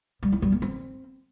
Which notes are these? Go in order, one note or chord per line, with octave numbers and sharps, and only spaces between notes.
G3
E4
G3
A#3
C4